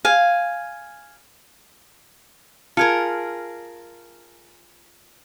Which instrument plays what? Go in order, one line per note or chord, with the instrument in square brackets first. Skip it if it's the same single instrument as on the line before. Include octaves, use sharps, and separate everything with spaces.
[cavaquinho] F5 G#5
[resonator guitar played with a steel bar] F4 G#4 A#4 [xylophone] A5 F6 C#7